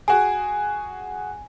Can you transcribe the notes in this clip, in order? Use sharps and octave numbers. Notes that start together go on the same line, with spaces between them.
F#4 G#4 G#5